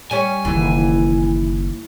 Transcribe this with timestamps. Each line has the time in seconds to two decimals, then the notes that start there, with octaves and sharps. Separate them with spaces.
0.11 G3 C#4 C#5 G#5
0.45 F#1 D#3 E3